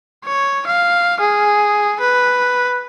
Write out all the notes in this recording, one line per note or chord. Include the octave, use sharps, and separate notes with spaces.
C#5
F5
G#4
B4